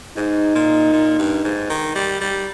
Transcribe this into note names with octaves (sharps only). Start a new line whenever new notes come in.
G#2 D#4
A#2
A#2
G2
G#2
D#3
G3
G3